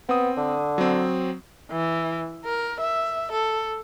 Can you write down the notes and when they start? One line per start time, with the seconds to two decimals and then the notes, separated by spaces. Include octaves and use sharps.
0.09 B3 C4 D#6
0.37 D3
0.78 F#3 C4
1.71 E3
2.44 A#4
2.81 E5
3.31 A4